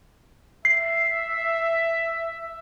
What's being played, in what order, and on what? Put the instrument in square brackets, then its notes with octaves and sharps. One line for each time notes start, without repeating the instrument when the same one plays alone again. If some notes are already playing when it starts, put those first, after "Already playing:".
[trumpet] E5 [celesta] C7